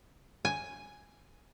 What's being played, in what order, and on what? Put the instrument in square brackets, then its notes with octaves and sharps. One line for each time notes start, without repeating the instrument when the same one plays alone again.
[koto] G#5